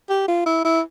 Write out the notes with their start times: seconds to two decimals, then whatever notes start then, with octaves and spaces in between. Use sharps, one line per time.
0.10 G4
0.28 F4
0.46 E4
0.65 E4